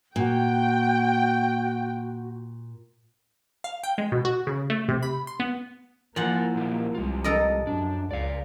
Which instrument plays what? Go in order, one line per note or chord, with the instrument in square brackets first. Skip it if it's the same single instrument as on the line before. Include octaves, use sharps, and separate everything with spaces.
[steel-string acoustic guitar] A#2 [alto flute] F#4 [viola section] G5
[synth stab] F5
G5
G#3
B2
F#4
C#3
A3
C3
B5
C6
B3
[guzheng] F3 F#5 [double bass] A#3 E4 [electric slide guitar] A#4 G#5
[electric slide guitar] A#2 F#3 G4
[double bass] C2 [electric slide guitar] G#3 F4
[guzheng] A4 A#4 D#5
[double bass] F#2 [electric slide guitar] D4
[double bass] C#2 [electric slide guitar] D5 F5